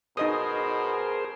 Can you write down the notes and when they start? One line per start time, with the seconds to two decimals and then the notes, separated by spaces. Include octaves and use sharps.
0.17 B2 D#4 G#4 A#4 C5 D#5 D#6